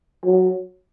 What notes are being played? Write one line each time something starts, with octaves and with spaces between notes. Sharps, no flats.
F#3